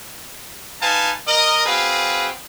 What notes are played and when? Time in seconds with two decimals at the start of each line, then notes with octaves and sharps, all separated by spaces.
0.82 D#4 B4 F5 G#5 A5
1.27 A#4 D#5
1.66 C4 F#4 G#4 B4 F5